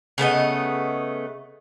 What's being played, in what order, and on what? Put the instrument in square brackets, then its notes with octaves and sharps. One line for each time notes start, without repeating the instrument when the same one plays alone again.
[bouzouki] C#3 A3 B3 D#5